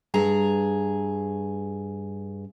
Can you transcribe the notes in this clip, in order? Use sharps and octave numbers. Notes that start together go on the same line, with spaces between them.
G2 G#4 A#5